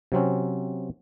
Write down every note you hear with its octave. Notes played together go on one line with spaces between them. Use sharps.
C3 F#3 C4 C#4